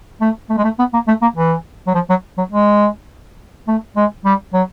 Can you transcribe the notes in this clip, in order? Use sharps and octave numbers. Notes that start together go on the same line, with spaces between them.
A3
A3
G#3
A3
B3
A#3
A3
A#3
E3
F#3
F3
F#3
F#3
G#3
A3
G#3
G3
F#3